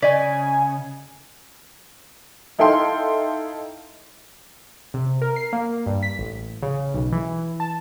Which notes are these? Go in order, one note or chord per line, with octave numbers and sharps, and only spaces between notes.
C#3 C#4 D5 D#5 G#5 B6
D#4 E4 A4 F5 G5 C6
C3
A#4
C7
A#3
G2
B6
A1
C#3
B1
E3
A5